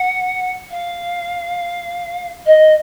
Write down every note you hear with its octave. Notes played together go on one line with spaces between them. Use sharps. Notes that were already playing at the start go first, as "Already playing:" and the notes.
Already playing: F#5
F5
D#5